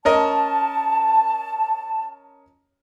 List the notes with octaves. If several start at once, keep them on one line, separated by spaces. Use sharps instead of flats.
C#4 A#4 D#5 A5